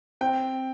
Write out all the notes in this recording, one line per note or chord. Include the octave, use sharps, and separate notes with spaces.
C4 G5